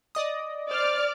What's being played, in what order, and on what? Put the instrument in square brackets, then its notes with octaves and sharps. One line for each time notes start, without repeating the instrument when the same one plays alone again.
[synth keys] D5 D#5 D#6
[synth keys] C5 [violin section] D5 D6 F6